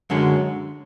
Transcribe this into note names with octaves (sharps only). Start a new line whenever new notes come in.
F#2 D3 G#3 C#4